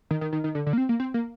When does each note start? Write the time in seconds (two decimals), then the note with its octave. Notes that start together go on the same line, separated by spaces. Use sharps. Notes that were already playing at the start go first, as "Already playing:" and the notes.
0.11 D#3
0.21 D#3
0.33 D#3
0.44 D#3
0.55 D3
0.67 D3
0.73 A#3
0.78 C4
0.89 A#3
1.00 C4
1.14 A#3